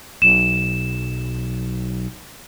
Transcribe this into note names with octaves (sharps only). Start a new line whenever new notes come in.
B1 E7